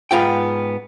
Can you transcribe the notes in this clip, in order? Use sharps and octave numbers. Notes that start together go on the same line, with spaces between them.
G#2 B3 F4 G5